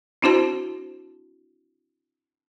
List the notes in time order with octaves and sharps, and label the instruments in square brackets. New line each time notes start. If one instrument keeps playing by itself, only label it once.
[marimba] C4 D4 E4 F#4 C5 A5